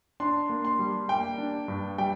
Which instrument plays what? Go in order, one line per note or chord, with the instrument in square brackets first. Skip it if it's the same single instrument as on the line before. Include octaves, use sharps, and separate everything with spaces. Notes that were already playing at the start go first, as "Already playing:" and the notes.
[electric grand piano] D4 [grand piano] C6
[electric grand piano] A#3
[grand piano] C6
[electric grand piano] G3
[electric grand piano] A#3 [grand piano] G5
[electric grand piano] D4
G2
[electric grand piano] G3 [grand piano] G5